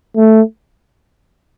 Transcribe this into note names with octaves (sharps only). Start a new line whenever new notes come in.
A3